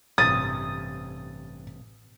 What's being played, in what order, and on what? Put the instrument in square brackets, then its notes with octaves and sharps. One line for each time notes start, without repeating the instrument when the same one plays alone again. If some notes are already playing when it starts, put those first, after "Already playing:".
[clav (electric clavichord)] A1 G2 C3 [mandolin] D#6 [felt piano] A6